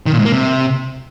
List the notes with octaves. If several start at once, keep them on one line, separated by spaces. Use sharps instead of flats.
D#3
A#2
G#2
A#3
C3